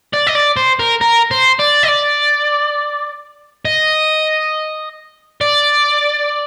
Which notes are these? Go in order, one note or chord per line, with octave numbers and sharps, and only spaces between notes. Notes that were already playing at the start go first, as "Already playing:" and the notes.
D5
D#5
D5
C5
A#4
A#4
C5
D5
D#5
D5
D#5
D5